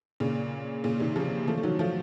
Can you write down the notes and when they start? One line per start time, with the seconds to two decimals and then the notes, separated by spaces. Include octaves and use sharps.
0.20 A#2 C#3
0.84 A#2 C#3
1.00 C3 D#3
1.16 C#3 F3
1.48 F3 A3
1.58 A3
1.63 D#3 F#3
1.79 F3 A3